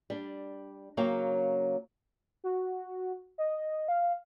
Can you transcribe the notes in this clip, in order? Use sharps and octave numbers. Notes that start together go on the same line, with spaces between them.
G3 D4
C#3 F#3 A#3 F5 G5
F#4
D#5
F5